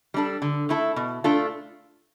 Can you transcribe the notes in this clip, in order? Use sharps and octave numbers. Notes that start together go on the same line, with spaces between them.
G3 D4 A4
D3
A3 E4 A4
B2
A3 D4 F4 A4